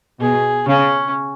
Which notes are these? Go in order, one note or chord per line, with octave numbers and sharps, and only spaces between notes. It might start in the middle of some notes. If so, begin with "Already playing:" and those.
B2 G#4
C#3 C#4